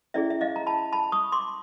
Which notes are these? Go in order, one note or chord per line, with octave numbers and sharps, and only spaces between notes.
C#4 E4 G#4 D5 E5
E5
D#5 F5
A#5
A5 B5
A5 B5
C#6 D#6
C6 D6